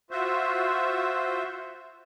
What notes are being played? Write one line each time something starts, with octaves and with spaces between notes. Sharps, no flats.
F4 F#4 C5 E5